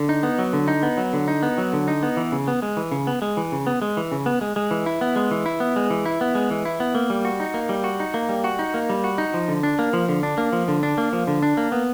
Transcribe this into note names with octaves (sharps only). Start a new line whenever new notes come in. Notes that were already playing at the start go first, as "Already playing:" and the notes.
Already playing: D3
D#4
B3
F#3
D3
D#4
B3
F#3
D3
D#4
B3
F#3
D3
D#4
B3
E3
C#3
B3
G#3
E3
C#3
B3
G#3
E3
C#3
B3
G#3
E3
C#3
B3
G#3
G#3
E3
E4
B3
G#3
E3
E4
B3
G#3
E3
E4
B3
G#3
E3
E4
B3
A#3
G3
F#4
D#4
A#3
G3
F#4
D#4
A#3
G3
F#4
D#4
A#3
G3
F#4
D#4
F3
D3
D4
A#3
F3
D3
D4
A#3
F3
D3
D4
A#3
F3
D3
D4
A#3
B3